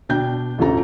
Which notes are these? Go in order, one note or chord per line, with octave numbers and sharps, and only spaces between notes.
B2 D4 G5 G6
A1 D2 F3 A4 A#5